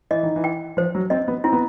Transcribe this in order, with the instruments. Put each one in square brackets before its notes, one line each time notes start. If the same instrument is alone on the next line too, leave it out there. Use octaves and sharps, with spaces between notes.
[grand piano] E3 [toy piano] D#5
[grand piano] D#3
E3
[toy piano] G5
[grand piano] F3 [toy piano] C5
[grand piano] F#3
[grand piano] C4 [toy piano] D#5
[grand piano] B3
[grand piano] C4 [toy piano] E4
[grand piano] B3